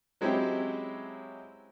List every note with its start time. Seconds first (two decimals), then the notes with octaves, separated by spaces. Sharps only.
0.21 F#3 G#3 C4 C#4 E4 G4